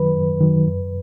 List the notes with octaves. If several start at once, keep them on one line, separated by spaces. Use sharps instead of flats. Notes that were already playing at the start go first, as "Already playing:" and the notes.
Already playing: F#2 D#3 F#3 B4
F#2
D#3 F#3
F#2